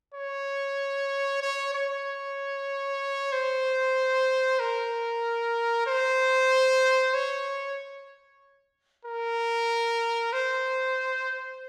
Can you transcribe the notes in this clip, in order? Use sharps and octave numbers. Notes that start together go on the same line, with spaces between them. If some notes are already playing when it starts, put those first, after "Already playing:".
C#5
C#5
C#5
C5
A#4
C5
C#5
A#4
C5